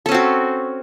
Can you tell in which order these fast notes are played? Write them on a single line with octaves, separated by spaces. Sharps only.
A4 C#4 C4 F#4